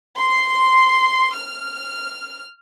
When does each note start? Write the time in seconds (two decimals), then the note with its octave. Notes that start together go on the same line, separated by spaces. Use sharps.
0.17 C6
1.35 F6